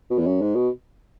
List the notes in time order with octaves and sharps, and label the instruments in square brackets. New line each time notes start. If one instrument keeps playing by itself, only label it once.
[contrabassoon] B2
E2
F#2
G#2
B2